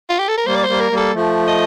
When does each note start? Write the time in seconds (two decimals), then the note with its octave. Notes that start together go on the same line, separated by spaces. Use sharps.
0.09 F4
0.19 G4
0.28 A4
0.38 A#4
0.46 G3 A#3 C5
0.55 D5
0.64 C5
0.69 G3 A#3
0.80 A#4
0.91 G3 A#3
0.97 A4
1.15 F3 A3
1.48 D#5